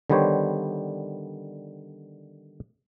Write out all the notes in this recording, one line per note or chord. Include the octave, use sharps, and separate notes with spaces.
D3 D#3 G3 B3 C5 C#5